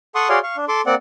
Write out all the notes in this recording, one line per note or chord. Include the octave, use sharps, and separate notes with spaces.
A4 F#5 C6 C#6 D#6
F#4 G#4 C#5 D5 F5 C6
F5 C#6
D4
A4 C6 D6
A#3 C4 D5 F#5